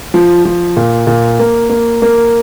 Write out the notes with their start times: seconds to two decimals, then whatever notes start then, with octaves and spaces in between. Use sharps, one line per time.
0.14 F3
0.45 F3
0.77 A#2
1.07 A#2
1.39 A#3
1.70 A#3
2.02 A#3